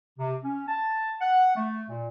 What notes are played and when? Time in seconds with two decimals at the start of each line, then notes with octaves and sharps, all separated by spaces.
0.19 C3
0.44 C#4
0.68 A5
1.21 F#5
1.56 A3
1.89 A#2